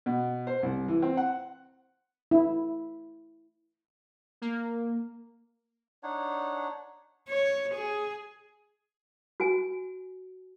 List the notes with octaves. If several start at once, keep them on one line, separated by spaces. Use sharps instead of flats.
B2
C5
C2
E3
C4
F#5
E4
A#3
D4 D#4 C#5 F#5
C#5
G#4
F#4 G#5